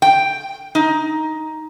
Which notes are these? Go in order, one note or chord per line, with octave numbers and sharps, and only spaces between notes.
G5
D#4